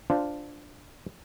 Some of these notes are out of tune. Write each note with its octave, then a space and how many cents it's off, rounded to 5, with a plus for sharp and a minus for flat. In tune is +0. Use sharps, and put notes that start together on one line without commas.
D4 +0 F4 +0 C5 -10